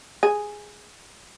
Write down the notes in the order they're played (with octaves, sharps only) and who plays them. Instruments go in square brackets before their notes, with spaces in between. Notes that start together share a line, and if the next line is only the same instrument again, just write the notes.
[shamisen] G#4